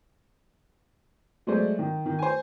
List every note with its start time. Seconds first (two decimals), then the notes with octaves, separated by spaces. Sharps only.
1.47 F#3 G#3 A3 C5 D5
1.79 D#3
2.06 D#3
2.19 C5 G#5